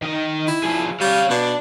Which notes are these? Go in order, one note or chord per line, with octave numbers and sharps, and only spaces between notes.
D#3 D#5
E4
F3 G#4
G3 C#5 F5
B2 D4